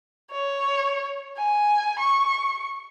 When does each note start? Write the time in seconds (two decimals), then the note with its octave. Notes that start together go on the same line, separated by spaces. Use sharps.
0.31 C#5
1.38 G#5
1.99 C#6